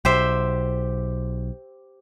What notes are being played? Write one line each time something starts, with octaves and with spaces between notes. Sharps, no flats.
B1 G4 C5 E5